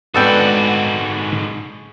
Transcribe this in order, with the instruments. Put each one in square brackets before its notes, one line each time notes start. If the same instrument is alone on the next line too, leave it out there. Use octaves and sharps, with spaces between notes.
[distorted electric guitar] G#2 F#4 [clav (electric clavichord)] B3 A4 G5 [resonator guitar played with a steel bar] C4 D4 B4